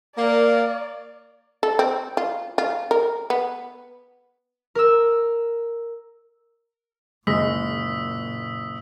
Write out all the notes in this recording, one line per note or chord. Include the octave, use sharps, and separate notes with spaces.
A#3 D5
A4
C4
F4
F4
A#4
B3
A#4 E6
F#1 A#2 G#3 D#6 E6 A#6 B6